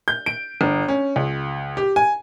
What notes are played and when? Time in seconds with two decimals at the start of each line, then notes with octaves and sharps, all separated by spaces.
0.08 G6
0.26 D7
0.61 G1
0.88 C#4
1.16 C#2
1.77 G4
1.96 G#5